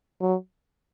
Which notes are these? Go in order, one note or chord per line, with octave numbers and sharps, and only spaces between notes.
F#3